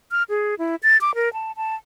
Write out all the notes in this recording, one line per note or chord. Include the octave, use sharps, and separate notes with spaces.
F6
G#4
E4
A6
D6
A#4
A5
A5